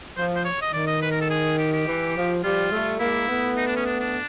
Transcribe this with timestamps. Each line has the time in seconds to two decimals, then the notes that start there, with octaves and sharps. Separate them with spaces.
0.17 F3 C5
0.36 C5
0.45 C#5
0.62 D#5
0.73 D#3 D5
0.87 D#5
1.02 B4
1.11 A#4
1.21 A4
1.30 G#4
1.58 G4
1.73 G4
1.87 E3
2.15 F3
2.43 F3 G3 F4
2.72 G3 A3
3.00 G#3 A#3 E4
3.28 A3 B3
3.57 D#4
3.66 D4
3.76 C#4
3.85 D4
4.00 D4